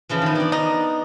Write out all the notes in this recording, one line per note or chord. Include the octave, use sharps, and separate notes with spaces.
C#3 E3 F3
D#3 B3
D4 D5
D#4